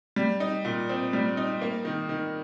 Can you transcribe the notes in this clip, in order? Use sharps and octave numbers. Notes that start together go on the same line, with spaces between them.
G3
D#4
A#2
C4
G3
D#4
A#3
D#3
D#3